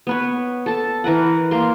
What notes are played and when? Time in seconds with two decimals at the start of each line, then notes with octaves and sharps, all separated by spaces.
0.07 B3 B4 C#5
0.66 A4 A5
1.04 E3 A#4 B4 F#5
1.51 A#3 A#4 C6